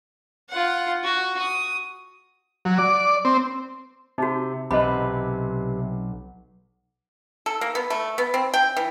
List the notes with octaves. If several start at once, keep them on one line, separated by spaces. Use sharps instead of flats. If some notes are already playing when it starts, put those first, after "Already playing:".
F4 F#5
F#4
D#6
F#3
D5
C4
C3 D#4 F#4
B1 C3 B4 D#5 B5
A4
A#3
B3
A3
B3
C4
G5
E3